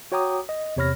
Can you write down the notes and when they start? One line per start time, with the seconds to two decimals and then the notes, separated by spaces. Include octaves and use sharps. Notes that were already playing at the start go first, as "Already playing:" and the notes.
0.12 F#4 C#5 G5 A#5 D6 D#6
0.49 D#5
0.76 E2 C3 C#5 B5 F6 A#6